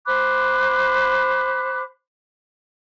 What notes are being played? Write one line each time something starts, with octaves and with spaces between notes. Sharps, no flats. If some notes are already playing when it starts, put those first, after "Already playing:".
C5 B5 D6 F#6